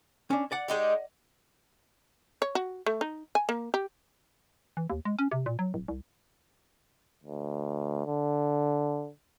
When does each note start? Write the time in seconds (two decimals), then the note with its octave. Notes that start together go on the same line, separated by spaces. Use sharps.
0.30 C#4 D4
0.52 D5 F#5
0.68 G#3 D#4 G4
2.42 C#5
2.55 F#4
2.86 A3
3.01 D#4
3.35 G#5
3.49 A#3
3.74 G4
4.77 E3
4.90 D#2
5.05 G#3
5.19 C#4
5.31 C3
5.46 A#2
5.59 F#3
5.74 D1
5.88 C2
7.24 D2
8.07 D3